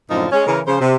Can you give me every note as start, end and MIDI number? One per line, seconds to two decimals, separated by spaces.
0.10 0.26 42
0.10 0.26 45
0.10 0.26 50
0.10 0.26 53
0.10 0.26 60
0.10 0.26 63
0.31 0.46 56
0.31 0.46 61
0.47 0.60 49
0.47 0.60 52
0.47 0.60 70
0.66 0.80 49
0.66 0.80 53
0.66 0.80 72
0.81 0.96 48